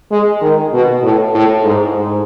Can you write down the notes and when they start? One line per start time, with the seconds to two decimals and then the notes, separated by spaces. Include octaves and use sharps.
0.11 G#3
0.41 D#3
0.73 B2
1.03 A2
1.34 A2
1.64 G#2
1.95 G#2